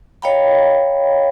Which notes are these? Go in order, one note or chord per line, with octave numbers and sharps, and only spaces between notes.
C#5 D#5 F5 G5 A#5 B5